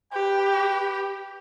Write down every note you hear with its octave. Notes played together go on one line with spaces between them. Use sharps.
G4 B4 G5